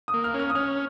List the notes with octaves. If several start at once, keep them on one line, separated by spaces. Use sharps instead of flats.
D#6
A#3
F6
C#4
F6
D#6
C#4 F6